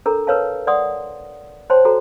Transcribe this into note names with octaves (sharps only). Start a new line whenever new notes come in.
D4 A4 A#4 A#5
A#4 B4 C#5 F5 A5
D5 F#5 C6 D#6
C5 C#5 G5 A5 C6
F#4 A4 A#5